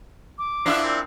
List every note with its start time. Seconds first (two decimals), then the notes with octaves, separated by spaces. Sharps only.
0.38 D6
0.66 D3 E3 F3 D4 E4 E5
0.84 A#2 C4